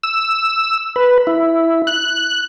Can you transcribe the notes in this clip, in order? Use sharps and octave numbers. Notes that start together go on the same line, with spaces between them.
E6
B4
E4
F#6